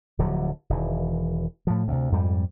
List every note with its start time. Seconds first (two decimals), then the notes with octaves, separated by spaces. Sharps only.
0.18 D1 D3 F3 F#3
0.70 E1 D#3 E3
1.67 A2 F3
1.88 D2 C3
2.12 F2 G#2 G3